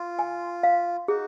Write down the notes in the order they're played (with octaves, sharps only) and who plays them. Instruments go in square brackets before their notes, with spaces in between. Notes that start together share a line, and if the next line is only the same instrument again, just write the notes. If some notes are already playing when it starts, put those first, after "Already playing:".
Already playing: [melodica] F4
[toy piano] G#5
F5
[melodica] D#4 F#4 [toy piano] G#4